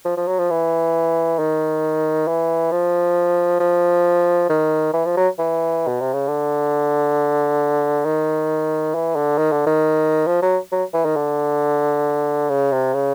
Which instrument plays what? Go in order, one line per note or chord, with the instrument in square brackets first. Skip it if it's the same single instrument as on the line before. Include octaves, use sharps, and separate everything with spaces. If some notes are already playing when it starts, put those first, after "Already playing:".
[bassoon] F3
F3
F#3
F3
E3
D#3
E3
F3
F3
D#3
E3
F3
F#3
E3
B2
C3
C#3
D3
D#3
E3
D3
D#3
D3
D#3
F3
F#3
F#3
E3
D#3
D3
C#3
C3
C#3